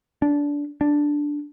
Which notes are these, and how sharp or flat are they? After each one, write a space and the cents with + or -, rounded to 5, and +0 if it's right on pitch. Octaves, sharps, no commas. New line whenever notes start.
D4 -20
D4 +0